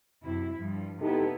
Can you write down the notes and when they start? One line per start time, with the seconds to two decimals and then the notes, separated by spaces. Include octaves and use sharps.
0.24 F#2 C3 E4
0.55 G2 F3
1.02 C3 B3 D#4 E4 G4 A4